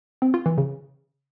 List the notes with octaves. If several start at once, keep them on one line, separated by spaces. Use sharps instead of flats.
C4
F4
E3
C#3